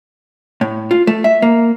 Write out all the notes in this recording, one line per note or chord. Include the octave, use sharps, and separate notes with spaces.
A2
F4
A3
E5
A#3